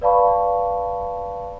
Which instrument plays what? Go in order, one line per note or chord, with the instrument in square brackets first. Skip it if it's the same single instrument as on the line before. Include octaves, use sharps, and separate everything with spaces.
[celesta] B4 D5 F5 A5 B5 C#6